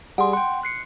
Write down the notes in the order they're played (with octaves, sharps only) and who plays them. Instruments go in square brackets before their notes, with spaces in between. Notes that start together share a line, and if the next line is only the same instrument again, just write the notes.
[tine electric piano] G3 G#4 [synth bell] F#5 C6
[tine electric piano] F#5 G5 [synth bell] C6
[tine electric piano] F#6 C7 C#7